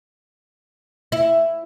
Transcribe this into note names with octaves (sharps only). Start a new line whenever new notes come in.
E4